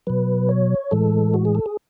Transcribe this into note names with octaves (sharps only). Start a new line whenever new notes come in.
B2 F#3 B4
C#5
A2 E3 G#3 A4
F#4
G#4
A4
G#4